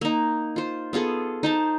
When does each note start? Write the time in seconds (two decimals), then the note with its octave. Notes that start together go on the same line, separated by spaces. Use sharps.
0.01 A#3 D#4
0.56 F4 C5
0.93 B3 F4 G#4 A4
1.43 D#4 C5 A5